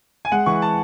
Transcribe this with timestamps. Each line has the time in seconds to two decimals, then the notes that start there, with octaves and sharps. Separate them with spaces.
0.25 G#5
0.32 G#3 F#5
0.46 E3 C#6
0.62 A5